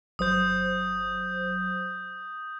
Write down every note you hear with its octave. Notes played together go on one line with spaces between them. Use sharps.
G1 F#3 C5 D#6 G6